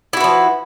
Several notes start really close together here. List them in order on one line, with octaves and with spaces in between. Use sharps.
E4 F#4 B4 F3